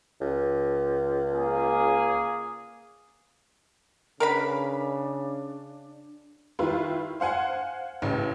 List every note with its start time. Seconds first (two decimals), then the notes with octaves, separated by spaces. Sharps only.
0.21 C#2
1.33 A#3 G#4
4.20 C#3 D4 A#4 B4 B5
6.59 D#3 G3 E4 F4 B4
7.20 C5 F5 F#5 G#5
8.02 A1 A2 C#3